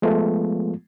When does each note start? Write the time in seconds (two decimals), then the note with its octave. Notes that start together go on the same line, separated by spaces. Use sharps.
0.02 F3 G#3 A3 B3 F4